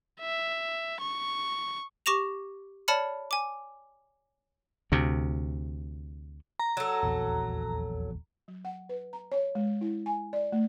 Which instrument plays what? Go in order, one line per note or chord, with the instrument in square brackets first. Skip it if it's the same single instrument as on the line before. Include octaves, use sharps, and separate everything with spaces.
[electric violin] E5
C#6
[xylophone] G4 C#6 D6 A#6 E7 F7
C#5 D5 A5 B5 F6 C#7
G#5 D6
[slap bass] D2 C3
[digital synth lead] A#5
[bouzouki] F#3 A4
[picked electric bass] D#1 A#1 E2
[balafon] F#3
F#5
B4
A#5
C#5
G#3
E4
G#5
D5
A3